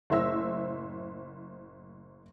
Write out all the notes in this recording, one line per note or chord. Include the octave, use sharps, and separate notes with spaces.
F#1 A2 C5 E5 E6 A#6